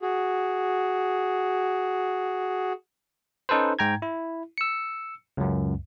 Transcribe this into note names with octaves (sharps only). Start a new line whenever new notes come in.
F#4 G#4
C#4 D#4 A4 B4 C5
G#2 G5 A#5 G#6
E4
E6 C#7
C#2 F#2